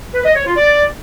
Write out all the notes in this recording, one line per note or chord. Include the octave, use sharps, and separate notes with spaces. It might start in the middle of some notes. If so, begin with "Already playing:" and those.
B4
D#5
C#5
F4
D5